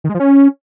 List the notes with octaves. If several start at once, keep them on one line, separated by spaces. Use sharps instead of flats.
D#3
G#3
F3
C#4